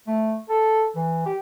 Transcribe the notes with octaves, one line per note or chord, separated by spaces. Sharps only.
A3
A4
E3
G4